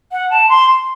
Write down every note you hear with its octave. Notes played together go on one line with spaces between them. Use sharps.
F#5
A5
C6